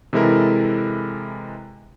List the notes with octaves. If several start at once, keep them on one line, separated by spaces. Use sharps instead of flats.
C3 E3 G#3 E4 A4 A#4